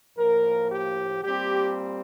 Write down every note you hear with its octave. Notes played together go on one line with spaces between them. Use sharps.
A2 F3 A#3 A#4
G4
A#2 G3 C4 G4